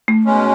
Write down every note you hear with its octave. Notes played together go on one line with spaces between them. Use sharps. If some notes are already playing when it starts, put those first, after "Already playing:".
A3
B2 G#3 C#4